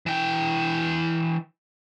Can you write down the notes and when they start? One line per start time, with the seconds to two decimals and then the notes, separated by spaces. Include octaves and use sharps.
0.06 E3 G5